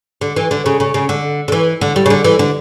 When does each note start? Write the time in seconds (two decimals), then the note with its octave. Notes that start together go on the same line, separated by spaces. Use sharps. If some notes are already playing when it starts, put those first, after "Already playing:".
0.21 D3
0.36 E3
0.51 D3
0.66 C#3
0.80 C#3
0.94 C#3
1.09 D3
1.48 D3
1.52 E3
1.81 D3
1.96 G3
2.06 C#3
2.10 D3
2.24 E3
2.39 D3